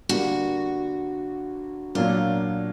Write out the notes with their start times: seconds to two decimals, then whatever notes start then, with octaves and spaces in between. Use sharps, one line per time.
0.09 D3 G3 A#3 F#4
1.95 A#2 F#3 A#3 D4 F4